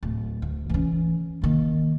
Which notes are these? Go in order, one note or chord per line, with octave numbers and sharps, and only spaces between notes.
D1
D2
E3 C#4
D#3 A#3